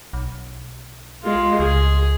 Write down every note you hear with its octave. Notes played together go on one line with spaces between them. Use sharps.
B1
G#3 F4
C#2 G#4